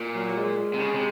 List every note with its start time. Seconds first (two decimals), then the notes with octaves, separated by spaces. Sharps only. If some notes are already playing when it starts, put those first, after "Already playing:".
Already playing: A#2
0.15 F#3
0.29 F#3
0.36 G#3
0.74 C3
0.80 C#3
0.94 C3